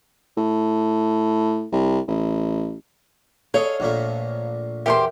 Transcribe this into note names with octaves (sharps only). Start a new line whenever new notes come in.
A2
C2
A1
G#4 A4 C#5 D#5 F5
A#1 A#2 A3
E2 D#3 G4 A#4 C5 E5 G5 C6